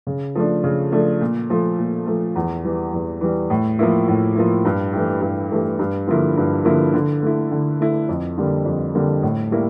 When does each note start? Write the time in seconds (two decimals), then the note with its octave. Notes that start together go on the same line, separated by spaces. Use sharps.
0.07 C#3
0.35 F3 A3 D4
0.64 C#3
0.92 F3 A3 D4
1.21 A#2
1.50 F3 A3
1.79 A#2
2.06 F3 A3
2.36 E2
2.65 E3 G3
2.94 E2
3.21 E3 G3
3.50 A2
3.79 F3 A#3 E4
4.08 A2
4.36 F3 A#3 E4
4.65 G2
4.93 E3 A3 E4 G4
5.21 G2
5.51 E3 A3 E4 G4
5.79 G2
6.07 D3 F3 A#3 E4
6.37 G2
6.65 D3 F3 A#3 E4
6.94 D3
7.22 A3 E4
7.51 D3
7.80 A3 E4
8.09 F2
8.38 D3 G3 A#3
8.66 F2
8.95 D3 G3 A#3
9.23 A2
9.51 G3 A#3 E4